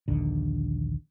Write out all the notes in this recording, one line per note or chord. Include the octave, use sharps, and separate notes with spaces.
A#1 D#2 D3